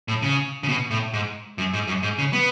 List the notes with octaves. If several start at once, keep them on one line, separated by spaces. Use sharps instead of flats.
A2
C#3
C#3
B2
A2
G#2
F#2
G#2
F#2
G#2
C#3
B3